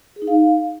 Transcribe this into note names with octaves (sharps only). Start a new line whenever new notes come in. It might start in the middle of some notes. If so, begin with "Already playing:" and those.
G#4
D#4
F5